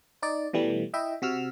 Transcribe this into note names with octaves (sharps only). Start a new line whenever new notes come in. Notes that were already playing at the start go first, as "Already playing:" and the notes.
D#4 D5
B2 E3 G3 A3
E4 D#5 E5 G5
C3 F#4 E6 F6